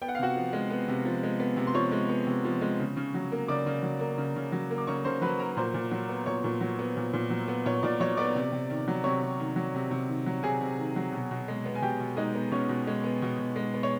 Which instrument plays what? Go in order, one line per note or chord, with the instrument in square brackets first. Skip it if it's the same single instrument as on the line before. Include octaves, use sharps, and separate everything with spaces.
[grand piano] B3 G5
F#5
F5
C3 F#4 F#5
F3
G#3
B3
C3
F3
G#3
B3
C3
C6
F3 C#5 C#6
G#3
B3
C3
F3
G#3
C#3
C#3
F#3
A#3
C#3 D5 D6
C#3
F#3
A#3
C#3
C#3
F#3
A#3
D6
C#3 C#5 C#6
C#3 C5 C6
F#3 B4 B5
A#3 A#4 A#5
A#2 C5 C6
A#2
F#3
B3
A#2 C#5 C#6
A#2
F#3
B3
A#2
A#2
F#3
B3
A#2 C#5 C#6
A#2 D5 D6
F#3 C#5 C#6
B3 D5 D6
C3
C3
D#3
F#3
C3 C#5 C#6
C3
D#3
F#3
C3
C3
D#3
F#3
C3 G#4 G#5
C3
D#3
F#3
B2
B2
G#3
B3
G#5
B2 G4 G5
B2
G#3 D#4 D#5
B3
B2 C#4 C#5
B2
G#3
B3
B2
B2
G#3
B3
C#5